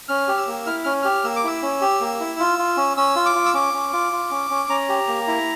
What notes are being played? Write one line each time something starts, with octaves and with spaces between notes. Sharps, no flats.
C#4 F6
G4
E6
A#3
E4 F6
C#4 F6
G4 F6
A#3 E6
D6
E4 E6
C#4
G4
A#3
E4
F4
F4
C#4
C#4 E6
F4
D6
F4
E6
C#4 D6
C#4
F4
F4
C#4
C#4
C#4 A#5
G4
A#3
E4